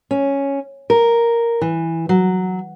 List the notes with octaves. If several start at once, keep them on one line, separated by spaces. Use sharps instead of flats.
C#4
A#4
E3
F#3